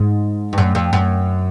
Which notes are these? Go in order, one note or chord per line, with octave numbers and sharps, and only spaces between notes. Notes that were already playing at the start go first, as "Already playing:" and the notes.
Already playing: G#2
G2
F#2
F2
F#2